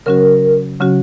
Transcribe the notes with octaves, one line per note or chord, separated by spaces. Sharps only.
C#3 F#3 C#4 F#4 A#4
C#3 F#3 C#4 F#4